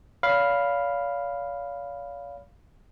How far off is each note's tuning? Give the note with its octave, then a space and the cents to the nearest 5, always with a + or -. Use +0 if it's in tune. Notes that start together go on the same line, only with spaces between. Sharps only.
C#5 +45 F5 +0 B5 +0